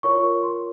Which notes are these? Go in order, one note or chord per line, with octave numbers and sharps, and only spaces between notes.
F4 A#4 C#5 C#6
C6